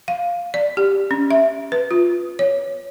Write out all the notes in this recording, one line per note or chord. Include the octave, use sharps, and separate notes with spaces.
F5
D5
G4
C#4
E5
B4
F4
C#5